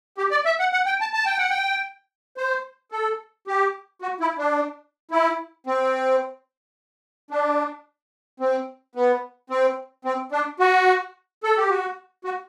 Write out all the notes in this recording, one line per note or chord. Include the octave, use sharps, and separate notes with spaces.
G4
D5
E5
F#5
F#5
G5
A5
A5
G5
F#5
G5
C5
A4
G4
F#4
E4
D4
E4
C4
D4
C4
B3
C4
C4
D4
F#4
A4
G4
F#4
F#4